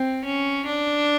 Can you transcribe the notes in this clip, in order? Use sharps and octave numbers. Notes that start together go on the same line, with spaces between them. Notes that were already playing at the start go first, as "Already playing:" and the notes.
Already playing: C4
C#4
D4